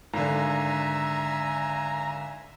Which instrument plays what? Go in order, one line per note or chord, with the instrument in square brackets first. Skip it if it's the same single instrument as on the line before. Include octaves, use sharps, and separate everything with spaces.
[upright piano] G#1 D3 [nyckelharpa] E5 G#5 [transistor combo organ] A#5